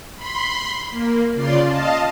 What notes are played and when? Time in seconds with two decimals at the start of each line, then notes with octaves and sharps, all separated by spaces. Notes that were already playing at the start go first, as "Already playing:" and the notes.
0.16 B5 C6
0.91 A#3
1.34 C#3 F4 D5 C6
1.66 D#5 F5 A5